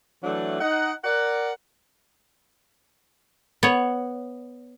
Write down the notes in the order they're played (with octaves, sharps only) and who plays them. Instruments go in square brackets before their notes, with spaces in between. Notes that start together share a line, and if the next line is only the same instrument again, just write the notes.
[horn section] E3 F#3 A3 D4
D#4 F#5
A#4 D5 F#5
[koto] B3 C#5